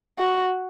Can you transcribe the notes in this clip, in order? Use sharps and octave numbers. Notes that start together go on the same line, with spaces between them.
F#4